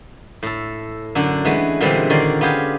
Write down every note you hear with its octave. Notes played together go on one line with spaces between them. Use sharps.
A2 A4
F#2 D3 D4
E3 G#3 A3 B3
A#2 D3 E3 G3 G#3 C4
D3 D#3 C#4 D5 C6
B3 F4 G4 G#4